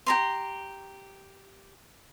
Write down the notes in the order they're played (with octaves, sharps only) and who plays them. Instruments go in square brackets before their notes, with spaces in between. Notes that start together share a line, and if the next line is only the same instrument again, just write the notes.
[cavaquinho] G4 A#5 C6